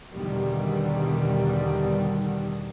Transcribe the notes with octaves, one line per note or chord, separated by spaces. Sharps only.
E2 B2 D3 D#3 G3